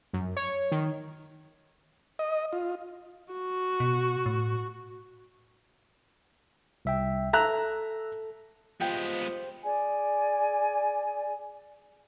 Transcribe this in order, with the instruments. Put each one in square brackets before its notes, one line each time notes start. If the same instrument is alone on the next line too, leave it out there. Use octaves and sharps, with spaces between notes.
[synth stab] F#2
C#5
D#3
[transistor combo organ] D#5
F4
[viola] F#4
[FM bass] B2
A2
[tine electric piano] C2 E5 G5
[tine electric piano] A4 [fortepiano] E5 A#5 F#6
[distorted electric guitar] G#3 B3 [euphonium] F4 [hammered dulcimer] G4 C5 [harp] G5
[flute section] G#4 D5 G#5